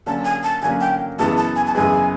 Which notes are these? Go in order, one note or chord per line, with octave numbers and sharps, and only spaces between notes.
D3 F#3 A#3 C#4 A5
G#5
A5
D3 F#3 A#3 C#4 G#5
G5
F#2 C#3 E3 G#3 B3 A5
A5
G#5
A5
F#2 C#3 E3 G#3 B3 G#5